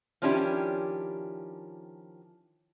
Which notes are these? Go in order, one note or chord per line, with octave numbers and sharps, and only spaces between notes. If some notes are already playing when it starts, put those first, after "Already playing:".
D#3 F3 C#4 D4 E4 G4